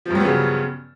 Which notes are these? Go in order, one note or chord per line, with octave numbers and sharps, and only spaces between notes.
G2 C#3 F3 F#3 B3